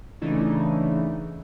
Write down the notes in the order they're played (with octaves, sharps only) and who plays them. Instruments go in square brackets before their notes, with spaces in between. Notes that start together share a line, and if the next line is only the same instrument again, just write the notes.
[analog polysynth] C#3 E3 A3 D4 D#4